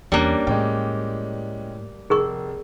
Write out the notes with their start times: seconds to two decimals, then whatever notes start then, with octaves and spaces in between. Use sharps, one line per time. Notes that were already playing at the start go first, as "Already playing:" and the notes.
0.12 E2 G3 A#3 C#4 D4 F#6
0.47 A2 G#3 C#4 G5
2.10 F1 G#4 A#4 C#6